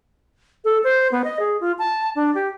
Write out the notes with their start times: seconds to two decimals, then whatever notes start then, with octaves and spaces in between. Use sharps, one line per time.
0.65 A4
0.84 C5
1.12 B3
1.24 D#5
1.39 G#4
1.61 F4
1.79 A5
2.15 D4
2.35 G4